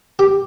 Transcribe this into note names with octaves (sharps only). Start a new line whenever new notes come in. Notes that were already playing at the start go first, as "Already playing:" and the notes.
G4